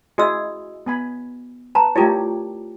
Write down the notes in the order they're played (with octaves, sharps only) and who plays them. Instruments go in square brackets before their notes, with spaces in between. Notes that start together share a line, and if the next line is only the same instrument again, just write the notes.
[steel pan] E4 G#4 [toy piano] F#4 D#5 E6
[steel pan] B3 G#5 B5
[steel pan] B4 [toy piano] A5 A#5
[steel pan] A3 G4 C#5 [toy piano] E4 F4 A#4